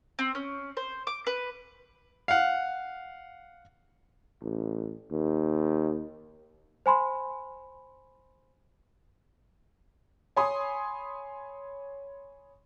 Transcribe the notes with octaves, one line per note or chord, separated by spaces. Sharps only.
C4
C#4
C5
D6
B4
F5 F#5
A1
D#2
C5 G#5 B5 C6
C#5 G#5 B5 C6 D#6